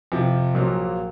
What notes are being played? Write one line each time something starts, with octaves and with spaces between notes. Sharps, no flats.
F2 C3 F3
A#1 A#2 F#3 A#3